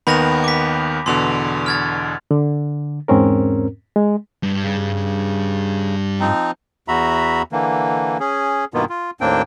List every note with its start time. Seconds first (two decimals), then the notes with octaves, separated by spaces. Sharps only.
0.07 D#2 D#3 B3 B5 A#6 F7
0.44 D6 B6
1.06 E2 B2 D3 C6 F7
1.66 F6 G#6 A6
2.31 D3
3.08 E2 G#2 C4 C#4 A#4
3.96 G#3
4.43 G2
4.63 C#3
6.20 F3 C4 D#4
6.88 E2 F#4 E5 A#5 B5
7.52 D3 E3 A#3
8.20 C#4 G#4
8.74 G2 B2 D#3 A#3 B3 F4
8.89 F4
9.21 D#2 A2 A#3 C4 D4 G5